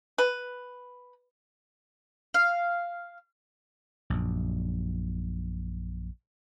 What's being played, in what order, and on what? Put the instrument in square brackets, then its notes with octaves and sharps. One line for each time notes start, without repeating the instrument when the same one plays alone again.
[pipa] B4
[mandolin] F5
[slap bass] A#1 F#2